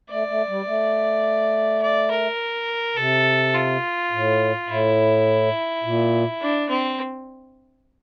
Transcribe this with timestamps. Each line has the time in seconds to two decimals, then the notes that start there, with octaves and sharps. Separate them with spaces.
0.10 A3 D5
0.29 A3
0.48 G3
0.67 A3
1.82 D5
2.11 A#4
2.97 C3 A4
3.55 F4
4.12 A2
4.69 A2 E4
5.84 A#2
6.41 D4
6.69 C4